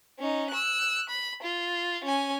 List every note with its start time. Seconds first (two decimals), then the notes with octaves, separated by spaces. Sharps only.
0.19 C#4 D#4
0.50 E6 F#6
1.09 B5
1.43 F4
2.04 C#4 G#5